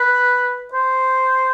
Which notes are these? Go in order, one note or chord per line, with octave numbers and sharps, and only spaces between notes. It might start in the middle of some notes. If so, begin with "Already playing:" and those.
Already playing: B4
C5